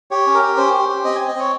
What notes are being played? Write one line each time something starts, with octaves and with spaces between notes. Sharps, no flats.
G4 C#5
C#4
A#4
G4
C#4 C5
G4
G4
C4 D#5
C4 G#5
D#5
C4 C#5